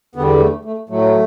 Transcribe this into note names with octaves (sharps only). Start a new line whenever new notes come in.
E2 D3 G3 B3
A3
A3
A2 F#3 A3